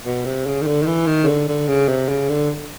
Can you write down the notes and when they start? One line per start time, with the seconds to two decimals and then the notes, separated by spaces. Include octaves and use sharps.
0.06 B2
0.25 C3
0.46 C#3
0.62 D#3
0.67 D3
0.82 D#3
0.87 E3
1.07 D#3
1.24 C#3
1.27 D3
1.48 D3
1.68 C#3
1.88 C3
2.09 C#3
2.29 D3